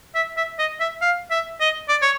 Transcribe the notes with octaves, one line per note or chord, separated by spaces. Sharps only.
E5
E5
D#5
E5
F5
E5
D#5
D5
C#5